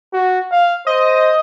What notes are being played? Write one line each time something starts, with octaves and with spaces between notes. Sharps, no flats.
F#4
F5
C5 D#5